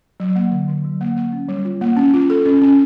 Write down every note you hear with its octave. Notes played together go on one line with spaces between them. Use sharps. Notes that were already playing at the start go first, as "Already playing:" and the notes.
F#3
A#3
D3
D3
F#3
A#3
A#3
C#4
G3
F4
A#3
C#4
F4
A4
C#4
C#4